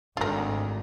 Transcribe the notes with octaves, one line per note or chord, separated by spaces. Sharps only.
G#1 D2 F4 A#4